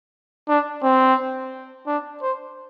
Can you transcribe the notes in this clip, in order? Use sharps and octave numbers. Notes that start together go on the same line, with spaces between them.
D4
C4
D4
C5